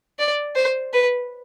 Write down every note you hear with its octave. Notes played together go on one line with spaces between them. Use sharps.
D5
C5
B4